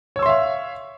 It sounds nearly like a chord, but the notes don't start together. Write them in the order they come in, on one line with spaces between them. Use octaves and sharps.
C#5 E6 C6 E5 F5